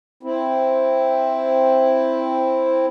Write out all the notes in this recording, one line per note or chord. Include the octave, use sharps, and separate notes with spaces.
C4 E4